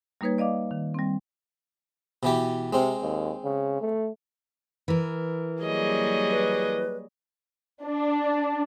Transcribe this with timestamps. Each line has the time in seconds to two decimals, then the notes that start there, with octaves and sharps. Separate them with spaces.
0.21 G3 A#3 D#4 B4 C#5 G#6
0.38 D5 D#5 F5 D6
0.71 D#3
0.94 G3 C4
2.23 B2 E3 G4
2.73 C3 G#3 C4
3.02 D#2
3.44 C#3
3.81 A3
4.88 E3 A#4
5.63 F#3 G3 A#3 G#4 D#5
6.30 B4
7.84 D4